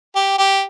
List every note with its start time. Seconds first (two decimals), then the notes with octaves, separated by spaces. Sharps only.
0.16 G4
0.38 G4